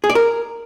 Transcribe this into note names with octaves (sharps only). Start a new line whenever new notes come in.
G#4
D5
A#4